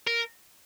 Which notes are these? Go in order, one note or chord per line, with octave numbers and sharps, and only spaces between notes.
A#4